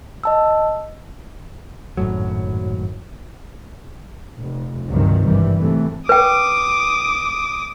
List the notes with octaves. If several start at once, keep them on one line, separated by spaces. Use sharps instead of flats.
D#5 A5 E6
G#1 F#2 A2 F#3
F1
C#2 G2 C3 D#3 F3 F#3
G#1 G2 E3 G3
G2 C3 E3 A3
B4 G5 D6 D#6